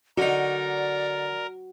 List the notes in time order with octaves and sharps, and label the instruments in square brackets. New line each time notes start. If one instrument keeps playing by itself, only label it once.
[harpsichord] D3 D#4 [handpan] F#4 [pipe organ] A#4 [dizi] D5